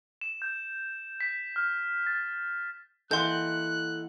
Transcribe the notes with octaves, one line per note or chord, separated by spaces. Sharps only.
E7
G6
B6
F6
A6
E3 A#3 A4 D#5 F#5 C6 F#6 G6